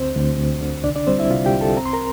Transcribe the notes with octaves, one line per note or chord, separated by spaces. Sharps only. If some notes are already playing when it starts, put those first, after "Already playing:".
Already playing: D2 C4 C5
D2
D2
D3
C2 D4 D5
D4 D5
G3 C4 C5
E4 E5
C3 F4 F5
G4 G5
C2
A4 A5
C4 A#5
C6
A#4 A#5